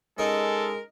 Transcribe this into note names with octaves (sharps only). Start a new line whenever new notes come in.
G#3 C#4 D#4 A4 A#4